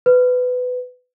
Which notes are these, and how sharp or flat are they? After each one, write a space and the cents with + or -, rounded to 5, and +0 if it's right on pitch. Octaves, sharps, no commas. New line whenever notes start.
B4 +20